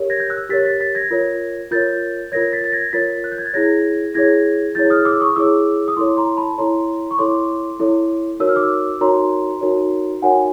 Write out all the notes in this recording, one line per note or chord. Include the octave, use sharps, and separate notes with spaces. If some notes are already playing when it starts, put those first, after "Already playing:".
Already playing: G4 A#4 C#5
G#6 A#6
G6
E6 F#6
G4 A#4 C#5 A6 B6
A6 B6
A6 B6
G#6 A#6
F4 A#4 C#5
F4 A#4 C#5 G6 A6
F4 A#4 C#5 G#6 A#6
A6 B6
A6
G#6 A#6
F4 A#4 C#5 A6 B6
F#6
G6
G#6
A6
E4 G#4 C#5 G#6 A#6
E4 G#4 C#5 G#6 A#6
E4 G#4 C#5 G6 A6
D#6 F6
D6 E6
C#6 D#6
E4 G#4 C#5 D6 E6
D#6
E4 A4 C#5 C6 D6
A#5 C6
A5 B5
E4 A4 C#5 A#5 C6
C#6
E4 A4 C#5 C6 D6
E4 A4 C#5
D#4 F#4 A#4 C#5 E6
F6
D6 E6
D#4 F#4 A#4 C#5 A#5 C6
D#4 F#4 A#4 C#5
D#4 F#4 A#4 C#5 F#5 G#5